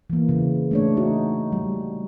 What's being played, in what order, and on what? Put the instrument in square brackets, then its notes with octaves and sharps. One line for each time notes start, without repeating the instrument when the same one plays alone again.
[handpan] E3 A#3
C#3
A3 D4 C#5
D#4 F#4
G3